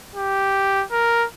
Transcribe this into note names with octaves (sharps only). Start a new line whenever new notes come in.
G4
A#4